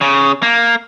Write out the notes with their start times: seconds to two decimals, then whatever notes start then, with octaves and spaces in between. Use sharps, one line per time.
0.01 C#3
0.42 A#3